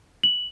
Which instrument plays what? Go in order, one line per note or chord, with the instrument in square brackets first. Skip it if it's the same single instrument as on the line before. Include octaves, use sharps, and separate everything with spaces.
[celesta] F#7